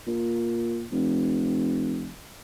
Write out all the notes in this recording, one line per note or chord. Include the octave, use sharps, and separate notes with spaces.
A#2
F1